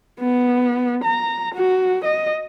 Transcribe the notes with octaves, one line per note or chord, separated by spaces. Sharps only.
B3
A#5
F#4
D#5